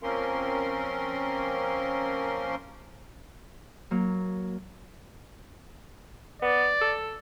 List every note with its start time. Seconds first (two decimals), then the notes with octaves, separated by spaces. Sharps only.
0.03 F3 A#3 C4 C#4 A#4 C6
3.91 F#3 A#3
6.42 B3 D5
6.82 A4